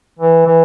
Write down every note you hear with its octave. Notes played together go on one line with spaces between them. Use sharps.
E3
E3